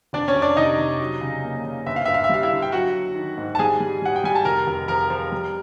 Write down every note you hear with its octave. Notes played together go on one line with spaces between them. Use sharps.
F1 D4 D5
C#4 C#5
F1
D4 D5
C3 D#4 D#5
C3
F#3
C#3
A#3
C#3
G1 E5
F5
G2 E5
F5
E5
G3 F5
E4 E5
D3
G5
F#3 F#4 F#5
F#3
D#3
G#2
A5
G3 G#4 G#5
G3
G3 F#5
G5
G3 G#5
A5
F1 A#4 A#5
F1
F3 A#4 A#5
F3
G3